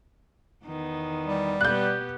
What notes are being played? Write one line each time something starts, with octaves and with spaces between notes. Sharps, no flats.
E2 D#3 B3
G3
B2 B3 G4 F#6 G6